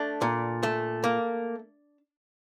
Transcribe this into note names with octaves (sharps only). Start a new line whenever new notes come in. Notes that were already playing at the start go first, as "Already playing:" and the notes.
Already playing: A3 D4
A#2
A3
A#3